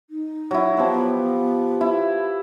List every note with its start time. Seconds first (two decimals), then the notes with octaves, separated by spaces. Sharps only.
0.10 D#4
0.51 F#3 E4
0.77 F3 B3 G4 B4
1.81 E4